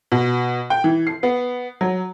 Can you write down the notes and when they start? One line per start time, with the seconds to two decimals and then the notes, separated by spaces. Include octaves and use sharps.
0.12 B2
0.70 G5
0.84 E3
1.07 C7
1.23 B3
1.81 F#3